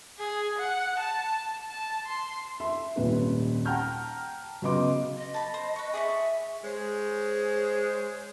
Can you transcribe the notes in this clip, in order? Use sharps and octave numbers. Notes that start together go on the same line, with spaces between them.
G#4
F#5
A5
A5
C6
E5 C6
D#1 G#1 A#2 B4
F#5 G5 A5 A#5 F6 G6
C#3 F#3 B3 D#5 C6 D6
D#5
A5 B5
C5
B4 C#6
G#4 D5 E5 C#6
G#3 G#4 C5 C#5